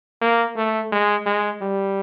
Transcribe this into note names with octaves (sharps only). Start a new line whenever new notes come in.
A#3
A3
G#3
G#3
G3